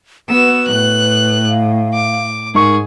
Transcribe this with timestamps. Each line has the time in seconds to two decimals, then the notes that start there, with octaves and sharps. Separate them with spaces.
0.29 B3 F#4 B4 E6
0.67 A2 F#6
1.48 F5
1.94 D6
2.55 G#2 G#4 A#4 C#6